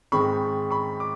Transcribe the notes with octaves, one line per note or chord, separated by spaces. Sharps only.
G#2 D#3 G#3 C4 B5 C#6
B5 C#6
D6